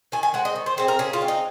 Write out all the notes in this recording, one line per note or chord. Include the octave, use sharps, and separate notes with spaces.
D#3 G#5
G#5
G#3 C4 F#5
D#5
D#3
C5
G#3 C4 C5
A#4
C#3 G#4
F4
G#3 C4
D#4